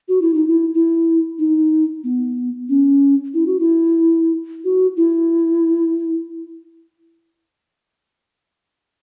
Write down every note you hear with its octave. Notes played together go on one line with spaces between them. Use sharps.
F#4
E4
D#4
E4
E4
D#4
B3
C#4
E4
F#4
E4
F#4
E4